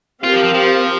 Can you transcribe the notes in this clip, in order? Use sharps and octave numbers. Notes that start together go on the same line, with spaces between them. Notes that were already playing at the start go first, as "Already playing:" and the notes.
C4 F4 G4 A#4 F5
F3
F3
F3